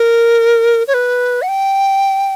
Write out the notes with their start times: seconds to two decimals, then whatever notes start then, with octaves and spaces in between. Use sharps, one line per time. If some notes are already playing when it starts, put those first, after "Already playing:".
Already playing: A#4
0.87 C#5
0.94 B4
1.42 F#5
1.48 G5